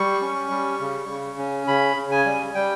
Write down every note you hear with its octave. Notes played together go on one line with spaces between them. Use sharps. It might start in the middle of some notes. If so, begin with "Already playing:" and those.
Already playing: G3 C#6
C#4
G3
C#3
C#3
C#4
C#3 B5
C#3
G#5
G3
G3 G5